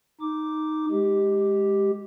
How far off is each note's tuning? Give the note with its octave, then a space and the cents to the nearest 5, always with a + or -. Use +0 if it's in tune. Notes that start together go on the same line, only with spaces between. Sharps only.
D#4 +0 D6 +0
G#3 +0 G4 +0